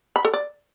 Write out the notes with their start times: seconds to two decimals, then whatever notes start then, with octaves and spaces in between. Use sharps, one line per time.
0.16 B5
0.25 A4
0.34 D5